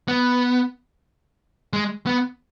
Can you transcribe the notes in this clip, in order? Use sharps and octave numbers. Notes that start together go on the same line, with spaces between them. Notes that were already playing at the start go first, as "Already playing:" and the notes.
B3
G#3
B3